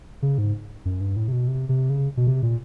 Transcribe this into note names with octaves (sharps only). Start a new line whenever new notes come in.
C#3
G#2
F#2
G2
A2
C3
B2
C3
C3
C#3
B2
C3
A#2